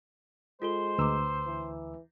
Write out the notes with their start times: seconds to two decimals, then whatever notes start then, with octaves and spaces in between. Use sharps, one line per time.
0.62 G#3 F4 A4 C5 G7
0.98 D2 B4 A#5 D6 E6
1.46 E3